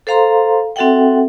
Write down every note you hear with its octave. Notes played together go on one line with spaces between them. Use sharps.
A4 C5 F5 A#5 C6
C4 F#4 A4 E5 F#5 G5